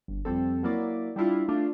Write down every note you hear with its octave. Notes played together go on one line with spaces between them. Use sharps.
G1
F2 G3 C4 A4
F#3 A#3 E4 D5
G3 D4 E4 F4
A3 D4 F4